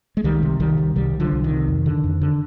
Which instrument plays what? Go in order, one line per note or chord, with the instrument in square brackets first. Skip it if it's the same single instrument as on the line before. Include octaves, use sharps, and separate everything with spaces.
[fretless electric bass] G#3
C2 D#3 G3
C3
C2 D#3 G3
C3
C2 D#3 G3
C3
D3 F3
C2
D#3
C3
F2
D3
F2
D3